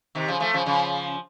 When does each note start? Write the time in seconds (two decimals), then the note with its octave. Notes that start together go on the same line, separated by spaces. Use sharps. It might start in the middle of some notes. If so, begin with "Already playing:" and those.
0.15 C3 D#3
0.28 C#3 F3
0.40 F3 A3
0.54 C#3 F3
0.66 C#3 F3